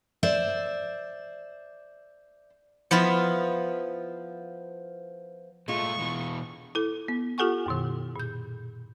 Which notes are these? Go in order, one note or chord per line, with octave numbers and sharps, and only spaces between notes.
C5 D5 E5
F3 B3 E4 F4
A#2 G#3 A3 F4 C#6
B2 E3
E4 A4
B3
F4 G4 A4 F#5 G#5 C#6
F#2 B2 D#3
A#2 G6